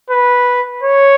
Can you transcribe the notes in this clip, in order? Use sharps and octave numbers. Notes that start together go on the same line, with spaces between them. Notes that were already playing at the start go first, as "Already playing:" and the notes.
B4
C#5